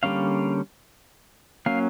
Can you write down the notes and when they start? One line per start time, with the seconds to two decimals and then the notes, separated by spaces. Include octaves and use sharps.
0.03 D3 G3 A#3 C#4 F5
1.66 F#3 A#3 C#4 F5